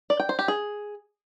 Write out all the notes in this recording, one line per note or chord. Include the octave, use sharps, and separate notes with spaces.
D5
G5
C5
G4
G#4